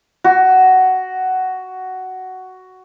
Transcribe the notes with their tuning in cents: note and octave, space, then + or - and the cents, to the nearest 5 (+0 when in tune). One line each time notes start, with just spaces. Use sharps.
F#4 +10